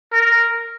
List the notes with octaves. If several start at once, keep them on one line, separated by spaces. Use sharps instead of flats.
A#4